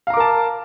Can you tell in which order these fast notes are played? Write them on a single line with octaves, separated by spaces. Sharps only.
F5 A#5 D6 A#4 A5